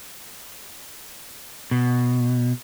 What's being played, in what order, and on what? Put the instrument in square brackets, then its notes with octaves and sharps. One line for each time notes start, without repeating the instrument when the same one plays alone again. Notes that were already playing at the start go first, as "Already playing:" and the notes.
[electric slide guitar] B2